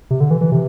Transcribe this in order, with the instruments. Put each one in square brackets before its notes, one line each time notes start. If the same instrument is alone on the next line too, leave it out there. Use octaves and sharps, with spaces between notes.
[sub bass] C3
D3
E3
E3
C3